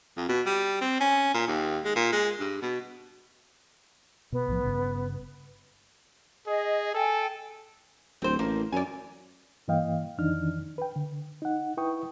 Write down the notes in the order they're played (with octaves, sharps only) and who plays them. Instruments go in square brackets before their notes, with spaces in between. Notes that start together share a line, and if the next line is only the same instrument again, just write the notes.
[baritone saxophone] F2
B2
G3
C4
C#4
A#2
D#2
G#3
A#2
G#3
G2
B2
[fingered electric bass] B2 [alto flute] B3
[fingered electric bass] B1 A2 F3
G1 G2 C#3
[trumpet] G#4 [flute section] D#5
[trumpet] A4 [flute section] G5 G#5
[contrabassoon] D1 [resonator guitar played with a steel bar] C4 C5
[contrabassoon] A1 [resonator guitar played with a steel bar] A#3
[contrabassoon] F#2 [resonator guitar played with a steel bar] D5 G#5
[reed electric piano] G2 E3 A#3 D#5 F5 G5
F2 D#3 E3 D4 D#4 F6
B4 G5
D3
D#4 F#5
E4 B4 G5 C#6 D#6